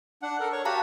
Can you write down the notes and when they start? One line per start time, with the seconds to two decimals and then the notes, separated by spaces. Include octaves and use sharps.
0.22 D4 F#5
0.40 A4 A#4
0.52 C#5 C#6
0.65 F#4 G4 F5 F#5 A5 A#5